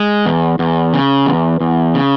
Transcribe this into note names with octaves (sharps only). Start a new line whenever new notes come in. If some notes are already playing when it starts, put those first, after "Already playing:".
Already playing: G#3
E2
E2
C#3
E2
E2
C#3